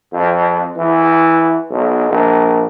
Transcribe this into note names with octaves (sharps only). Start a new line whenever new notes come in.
F2
E3
B1
A#1